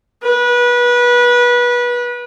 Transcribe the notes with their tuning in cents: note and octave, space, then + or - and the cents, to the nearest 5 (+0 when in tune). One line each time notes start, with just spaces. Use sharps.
B4 -25